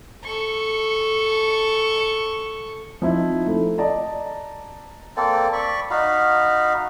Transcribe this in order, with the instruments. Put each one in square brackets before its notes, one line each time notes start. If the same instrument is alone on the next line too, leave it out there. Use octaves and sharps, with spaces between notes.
[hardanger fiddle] A4 C#6
[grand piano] F3 C4 D#4 E4
A3
D5 D#5 A5 A#5
[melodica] A#3 C4 A4 D5
D5 B5 C#6
D#4 F#4 F5 B5